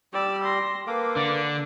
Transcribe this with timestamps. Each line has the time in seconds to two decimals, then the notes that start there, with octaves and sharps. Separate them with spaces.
0.14 G3 G4 D5 E6
0.44 C6 A#6
0.87 A#3 A4 B4 F5 D6
1.16 D3 D5